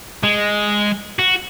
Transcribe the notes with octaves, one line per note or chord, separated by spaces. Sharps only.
G#3
F#4